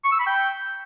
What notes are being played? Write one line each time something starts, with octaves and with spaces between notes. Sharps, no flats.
C#6
E6
B5
G5